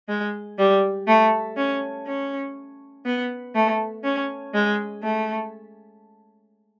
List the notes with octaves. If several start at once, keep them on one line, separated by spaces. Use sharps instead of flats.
G#3
G3
A3
C#4
C#4
B3
A3
C#4
G#3
A3